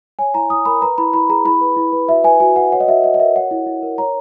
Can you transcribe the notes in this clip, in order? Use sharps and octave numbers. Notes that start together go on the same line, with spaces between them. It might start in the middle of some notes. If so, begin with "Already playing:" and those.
C#5 G#5
E4 A#5
E4 D#6
A#4 B5
B4 A#5
E4 B5
E4 B5
G#4 A#5
E4 B5
B4
E4
B4
F#4 E5
B4 G#5
F#4 G#5
B4 F#5
C#5 F#5
D#5
F#4 E5
F#4 D#5
D#5
A#4 E5
C#5 F#5
E4
E4
A#4
C#5 A#5